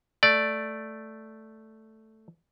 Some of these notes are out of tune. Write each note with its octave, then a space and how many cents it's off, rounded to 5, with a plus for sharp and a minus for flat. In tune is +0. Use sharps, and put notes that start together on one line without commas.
A3 +0 D5 +0